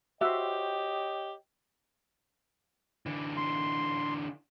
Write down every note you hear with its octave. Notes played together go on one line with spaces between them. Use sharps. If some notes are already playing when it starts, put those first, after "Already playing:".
F#4 G4 C5 C#5 D#5 E5 G5
D3 E3
C6